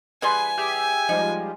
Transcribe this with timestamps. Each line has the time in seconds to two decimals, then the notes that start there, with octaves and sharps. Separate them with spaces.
0.22 E3 G3 G#4 B4 G#5 C6
0.58 G4 G#4 E5
1.09 F3 G3 G#3 D#4